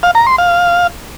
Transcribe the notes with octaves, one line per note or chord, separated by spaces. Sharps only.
F5
A#5
C6
F5